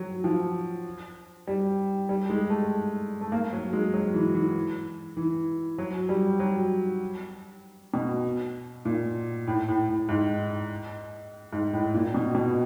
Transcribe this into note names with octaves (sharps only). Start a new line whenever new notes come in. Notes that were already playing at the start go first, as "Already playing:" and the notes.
Already playing: F#3
F3
G3
G3
G#3
A3
A3
A#3
F#3
G#3
F#3
E3
E3
E3
F#3
G3
F#3
B2
A#2
A2
A2
A2
G#2
G#2
A2
A#2
B2
B2